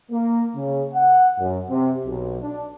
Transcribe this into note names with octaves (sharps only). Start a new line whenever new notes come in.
A#3
C#3
F#5
F#2
C3
B1
D4